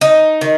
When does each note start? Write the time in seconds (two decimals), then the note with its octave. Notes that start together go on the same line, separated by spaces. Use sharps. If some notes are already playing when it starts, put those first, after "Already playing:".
0.01 D#4
0.41 D#3